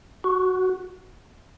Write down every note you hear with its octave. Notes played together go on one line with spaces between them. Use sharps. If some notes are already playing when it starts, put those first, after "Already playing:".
F#4